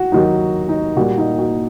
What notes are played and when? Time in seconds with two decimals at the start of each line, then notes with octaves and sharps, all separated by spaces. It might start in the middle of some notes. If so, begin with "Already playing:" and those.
Already playing: F#4
0.12 D#2 D#3 F#3 D#4
0.69 D#4
0.96 A#2 G3 A#3 F#4
1.18 D#4
1.39 F#4